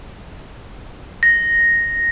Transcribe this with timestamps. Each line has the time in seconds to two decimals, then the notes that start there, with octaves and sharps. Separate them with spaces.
1.23 A#6